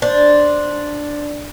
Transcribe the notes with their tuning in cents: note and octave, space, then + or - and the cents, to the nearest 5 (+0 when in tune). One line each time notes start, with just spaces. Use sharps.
D4 +0 C5 +0